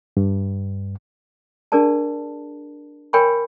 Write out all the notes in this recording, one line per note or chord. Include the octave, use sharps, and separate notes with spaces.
G2
D4 G#4 A#4 D5 A5
A#4 C#5 G5 G#5 B5 C#6